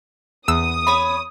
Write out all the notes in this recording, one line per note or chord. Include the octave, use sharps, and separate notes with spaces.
E2 D#6 E6
C#5 B5